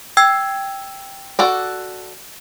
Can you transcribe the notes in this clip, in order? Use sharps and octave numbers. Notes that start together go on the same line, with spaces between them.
G5 E6 G#6
F#4 A4 D5